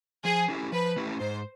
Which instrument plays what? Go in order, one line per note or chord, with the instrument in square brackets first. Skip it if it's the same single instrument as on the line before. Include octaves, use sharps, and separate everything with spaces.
[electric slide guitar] F3 [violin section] G#4
[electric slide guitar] A3 C#4 E4 G4
[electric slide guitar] F3 [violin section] B4
[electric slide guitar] A3 C#4 E4 G4
[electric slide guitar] G#2 [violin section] C5